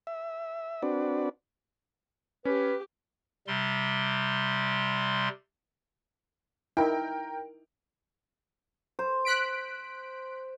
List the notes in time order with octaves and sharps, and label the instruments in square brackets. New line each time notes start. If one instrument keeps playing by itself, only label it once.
[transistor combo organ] E5
C4 D4 F#4 B4 D5
[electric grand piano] C#4 [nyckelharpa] G4 [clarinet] B4
[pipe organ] C3 G3 C6
[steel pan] D#4 E4 [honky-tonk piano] A#4 G5
[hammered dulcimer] C5
[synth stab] F#6 B6 D7